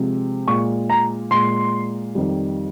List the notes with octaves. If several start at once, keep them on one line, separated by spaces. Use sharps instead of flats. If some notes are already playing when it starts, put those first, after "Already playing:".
Already playing: C3 F3 G#3
A#2 G#3 C#6
A#5
A#2 G#3 C6
F2 D#3 G3